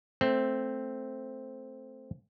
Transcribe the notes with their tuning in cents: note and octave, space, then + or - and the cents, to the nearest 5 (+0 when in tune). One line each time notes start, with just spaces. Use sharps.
A3 +0 C4 +0